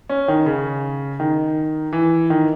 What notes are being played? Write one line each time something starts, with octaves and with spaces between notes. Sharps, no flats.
C#4
D#3
C#3
D#3
E3
D#3